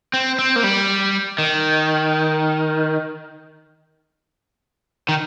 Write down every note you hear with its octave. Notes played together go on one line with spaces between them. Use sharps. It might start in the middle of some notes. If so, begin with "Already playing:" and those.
C4
C4
A#3
G3
D#3
D#3